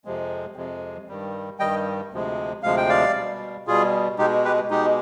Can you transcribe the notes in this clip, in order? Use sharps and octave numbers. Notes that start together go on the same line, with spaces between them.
F2 C3 F3 G#3
F2 C3 F3 G#3
G2 D#3 G3
G2 D#3 G3 D#5 G5
D2 C3 F3 G#3
D2 C3 F3 G#3 F5
G5
D5 F5
B2 G3
B2 G3 F4 G#4
B2 G#3 D#4 G4
G4 B4
B2 G#3 D#4 G4